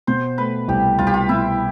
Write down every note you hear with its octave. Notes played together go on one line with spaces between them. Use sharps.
B2 C5
A3 B4
C2 G4
C2 F4
G4
F4
B2 E4